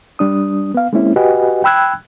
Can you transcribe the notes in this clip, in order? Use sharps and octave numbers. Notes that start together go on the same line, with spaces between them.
G3 D4 D#6
B3 F5
G#3 A#3 C4 C#4 E4
F#4 G4 B4 D#5 F#5 G#5
G5 B5 E6 F#6 G#6